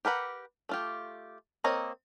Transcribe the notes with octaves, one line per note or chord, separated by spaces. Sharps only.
G4 A#4 B4 F#5
A3 F4 G4
A#3 C4 C#5 D#5 A#5